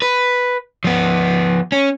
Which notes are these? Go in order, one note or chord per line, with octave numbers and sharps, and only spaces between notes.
B4
F3 B3
C#4